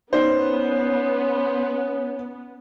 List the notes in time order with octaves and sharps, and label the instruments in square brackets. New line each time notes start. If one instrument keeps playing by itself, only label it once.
[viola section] B3 [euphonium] C#4 [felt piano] D#4 D5 [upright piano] C5